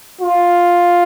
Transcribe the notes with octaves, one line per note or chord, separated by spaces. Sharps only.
F4